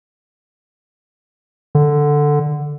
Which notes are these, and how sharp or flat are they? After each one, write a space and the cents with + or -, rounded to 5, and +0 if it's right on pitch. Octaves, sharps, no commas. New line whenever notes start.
D3 +5